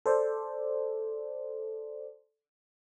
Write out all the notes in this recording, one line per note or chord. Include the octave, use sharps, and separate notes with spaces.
A4 C5 D5